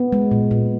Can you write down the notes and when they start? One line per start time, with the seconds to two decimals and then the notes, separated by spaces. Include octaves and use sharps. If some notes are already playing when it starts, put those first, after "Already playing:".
Already playing: B3
0.13 G#3
0.31 A#2
0.51 A#2